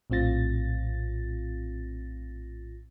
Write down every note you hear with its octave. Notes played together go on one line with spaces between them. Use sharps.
A#1 A2 C4 F4 A6 A#6